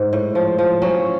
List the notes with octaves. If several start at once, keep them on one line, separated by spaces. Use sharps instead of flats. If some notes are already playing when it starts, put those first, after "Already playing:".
Already playing: G#2
A2
F3
F3
F#3 C#4